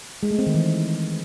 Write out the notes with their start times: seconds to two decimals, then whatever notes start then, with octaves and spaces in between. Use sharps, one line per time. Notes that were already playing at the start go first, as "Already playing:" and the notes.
0.23 G#3
0.31 A3
0.39 C4
0.47 D#3
0.55 E3